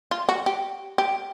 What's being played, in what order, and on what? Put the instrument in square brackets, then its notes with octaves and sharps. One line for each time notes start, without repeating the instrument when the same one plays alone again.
[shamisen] F4
F#4
G4
G4